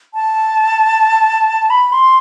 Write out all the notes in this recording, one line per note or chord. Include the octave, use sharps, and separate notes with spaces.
A5
B5
C6